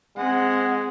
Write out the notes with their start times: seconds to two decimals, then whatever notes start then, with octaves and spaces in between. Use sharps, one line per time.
0.17 G#3 C4 F#5